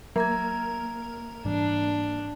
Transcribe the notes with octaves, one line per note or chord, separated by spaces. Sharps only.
F#3 A#3 E5 A#5 G#6
G#2 E3 G3 D4